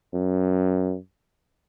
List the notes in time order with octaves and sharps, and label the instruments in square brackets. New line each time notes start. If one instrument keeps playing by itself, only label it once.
[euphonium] F#2